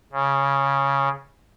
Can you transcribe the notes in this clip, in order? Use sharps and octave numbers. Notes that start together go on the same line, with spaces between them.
C#3